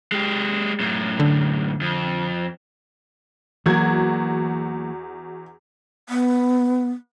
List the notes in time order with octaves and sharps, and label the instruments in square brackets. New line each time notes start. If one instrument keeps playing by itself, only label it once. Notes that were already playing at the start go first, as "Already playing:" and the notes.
[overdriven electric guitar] G#3 G4
F#2 A2
[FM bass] D3
[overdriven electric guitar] F2
[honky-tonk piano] E2 F#4 G#6 [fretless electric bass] E3 F#3 A#3
[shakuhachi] B3